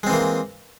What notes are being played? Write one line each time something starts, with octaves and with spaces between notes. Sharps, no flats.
E3 G#3 A#3 C4